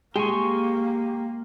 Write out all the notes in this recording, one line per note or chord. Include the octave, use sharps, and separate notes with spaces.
G#3 A#3 G4 G#5 C#6